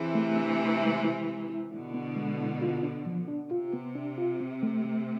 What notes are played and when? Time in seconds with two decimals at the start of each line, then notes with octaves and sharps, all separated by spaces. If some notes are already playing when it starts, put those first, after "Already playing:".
Already playing: C3 E3 G#4
0.15 A3
0.37 D4
0.59 A3
0.82 G#3
1.05 E4
1.27 G#3
1.49 E4
1.71 B2 D3 E4
1.94 B3
2.16 G#3
2.39 E4
2.62 F4
2.83 D4
3.06 F3
3.28 D4
3.50 C3 F4
3.74 B3
3.95 D4
4.18 F4
4.40 C4
4.63 A3
4.85 A3